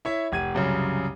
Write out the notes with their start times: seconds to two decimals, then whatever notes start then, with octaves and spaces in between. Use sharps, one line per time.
0.05 E4 C#5 E5
0.32 F1 G#6 D#7
0.54 C2 F#2 C#3